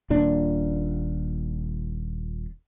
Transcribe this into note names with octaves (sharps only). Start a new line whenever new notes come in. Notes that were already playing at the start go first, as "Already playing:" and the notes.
D#1 A#2 D4